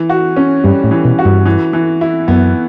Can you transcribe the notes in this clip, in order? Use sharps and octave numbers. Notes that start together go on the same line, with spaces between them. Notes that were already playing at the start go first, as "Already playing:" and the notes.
Already playing: E3
F#4
C#4
G2 G3
A2
E3
B2
F#4
G2
E3
E3
E4
F#2 B3